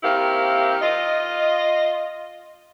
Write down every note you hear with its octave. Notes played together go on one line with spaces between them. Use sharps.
D#3 A#3 C4 E4 G4
F4 D#5